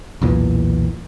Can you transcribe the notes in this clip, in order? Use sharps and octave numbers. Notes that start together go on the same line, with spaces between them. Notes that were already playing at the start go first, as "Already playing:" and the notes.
B1 E2 A#2 E3